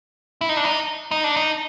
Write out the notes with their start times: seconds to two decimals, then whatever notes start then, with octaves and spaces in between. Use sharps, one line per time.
0.41 E4
0.49 D#4
0.57 D4
0.64 D#4
1.11 D#4
1.24 D4
1.36 D#4